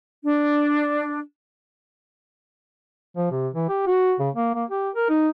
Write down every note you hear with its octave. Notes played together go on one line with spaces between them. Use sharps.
D4
F3
C3
E3
G4
F#4
C#3
A#3
A#3
G4
A#4
D#4